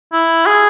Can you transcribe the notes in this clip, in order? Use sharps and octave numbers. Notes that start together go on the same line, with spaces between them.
E4
G#4